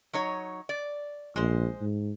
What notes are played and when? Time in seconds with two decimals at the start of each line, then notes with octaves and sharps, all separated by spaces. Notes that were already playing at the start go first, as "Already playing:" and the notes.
0.13 F#3 D#4 C#5
0.69 D5
1.36 A#1 G#3 C5
1.81 G#2